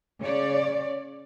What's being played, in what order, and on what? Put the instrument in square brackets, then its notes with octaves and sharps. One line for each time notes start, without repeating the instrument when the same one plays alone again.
[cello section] C#3 C#5 D5